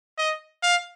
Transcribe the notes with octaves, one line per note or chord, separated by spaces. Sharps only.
D#5
F5